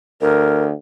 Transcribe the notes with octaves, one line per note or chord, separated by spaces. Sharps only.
D2 A#4